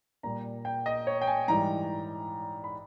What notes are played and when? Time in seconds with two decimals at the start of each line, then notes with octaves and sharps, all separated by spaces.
0.23 A#2 G3 A#5
0.65 G5
0.86 D#5
1.07 C#5
1.22 G5
1.27 G#5
1.48 G#2 E3 G3 A#5
2.64 B5